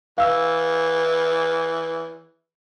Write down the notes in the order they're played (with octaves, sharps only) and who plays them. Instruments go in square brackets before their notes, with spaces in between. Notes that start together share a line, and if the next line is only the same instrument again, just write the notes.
[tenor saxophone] E3 [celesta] F5 E6